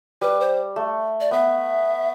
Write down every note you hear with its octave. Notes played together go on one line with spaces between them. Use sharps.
G3 B4
C5
A3
D5
B3 E5